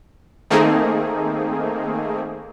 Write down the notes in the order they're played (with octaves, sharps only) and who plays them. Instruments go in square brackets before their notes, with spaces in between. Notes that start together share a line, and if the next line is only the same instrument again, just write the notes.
[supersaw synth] D#3 A3 A#3 C4 D#4 G#4